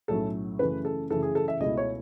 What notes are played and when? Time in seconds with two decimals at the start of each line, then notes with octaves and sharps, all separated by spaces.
0.08 B1 A2 F#3 C#4 A4
0.59 F#2 C#3 E3 A3 C#4 B4
0.85 A4
1.10 F#2 C#3 E3 A3 C#4 A4
1.22 G#4
1.35 A4
1.48 E5
1.60 C#2 B2 A3 E4 D#5
1.77 C#5